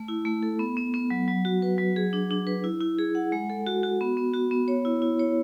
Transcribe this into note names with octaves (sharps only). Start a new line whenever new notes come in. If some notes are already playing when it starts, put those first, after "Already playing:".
Already playing: A3
E4
A3
A4
B3
B3
B3
F#3
F#3
F#4
B4
F#3
G#4
D4
D4
B4
E4
E4
G#4
F#5
G#3
A4
F#4
F#4
B3
B3
F#4
B3
C#5
E4
E4
C#5